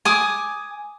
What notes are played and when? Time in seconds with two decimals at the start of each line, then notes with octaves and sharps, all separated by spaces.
0.05 G#5 D6 D#6